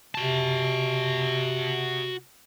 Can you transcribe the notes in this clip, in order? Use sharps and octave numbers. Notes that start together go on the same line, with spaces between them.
C3 F#4 A5